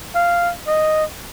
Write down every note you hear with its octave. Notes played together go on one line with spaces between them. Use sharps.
F5
D#5